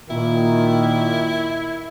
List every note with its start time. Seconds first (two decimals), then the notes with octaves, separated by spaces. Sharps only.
0.10 A#2 D#3 E4